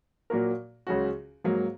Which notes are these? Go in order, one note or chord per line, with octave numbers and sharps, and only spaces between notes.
A#2 F#3 A#3 F#4 A#4
C#2 C#3 F#3 C#4 F#4
G#2 F#3 A#3